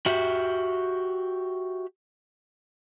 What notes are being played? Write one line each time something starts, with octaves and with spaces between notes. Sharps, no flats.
F#4 G4 E5